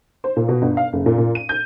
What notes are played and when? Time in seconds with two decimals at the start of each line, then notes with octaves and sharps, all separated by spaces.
0.24 C5
0.36 A#2
0.48 B2
0.62 G1
0.77 F5
0.93 F#1
1.06 A#2
1.18 A#2
1.35 D#7
1.49 G6